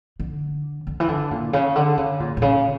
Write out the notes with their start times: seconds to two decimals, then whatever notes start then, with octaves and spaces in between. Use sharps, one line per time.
0.20 D3
0.87 D3
1.00 E3
1.08 D3
1.31 A#2
1.53 C#3
1.76 D3
1.97 C#3
2.20 A#2
2.37 A#2
2.42 C#3